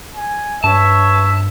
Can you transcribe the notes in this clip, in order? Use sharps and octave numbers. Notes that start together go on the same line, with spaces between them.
G#5
G2 B4 C#5 E5 A5